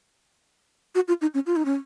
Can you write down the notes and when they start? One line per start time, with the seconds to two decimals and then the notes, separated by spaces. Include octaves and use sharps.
0.95 F#4
1.08 F4
1.21 D#4
1.34 C#4
1.46 F4
1.56 D#4
1.65 C#4